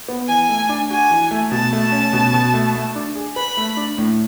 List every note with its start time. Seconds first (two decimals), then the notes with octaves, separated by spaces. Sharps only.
0.08 B3
0.28 E3 G#5
0.49 A3
0.69 D4
0.90 F#4 G#5
1.10 E3
1.31 A3
1.51 B2 A5
1.73 A3
1.92 C#4
2.13 B2
2.33 B2
2.54 A3
2.75 A3
2.95 D4
3.15 G#4
3.36 B4 B5
3.57 A3
3.77 D4
3.98 A2